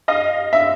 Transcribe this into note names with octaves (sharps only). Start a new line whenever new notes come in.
D#5 F5
E5